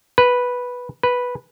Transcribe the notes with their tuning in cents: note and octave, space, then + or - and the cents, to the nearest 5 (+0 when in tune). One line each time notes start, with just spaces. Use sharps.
B4 -5
B4 -5